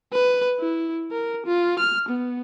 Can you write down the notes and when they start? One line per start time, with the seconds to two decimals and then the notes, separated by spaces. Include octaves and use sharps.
0.13 B4
0.60 E4
1.12 A#4
1.46 F4
1.79 F6
2.09 B3